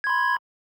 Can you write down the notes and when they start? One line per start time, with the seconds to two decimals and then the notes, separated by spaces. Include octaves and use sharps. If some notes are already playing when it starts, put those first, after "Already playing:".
0.04 G#6
0.07 C6
0.10 B5